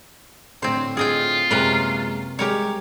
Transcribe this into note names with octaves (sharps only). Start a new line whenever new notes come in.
A2 D3 C4 C5
F4 G#4 D#5 G5
F#2 C3 G#3 A#3 A#4 B4
G3 G#3 G4 A#4 C#5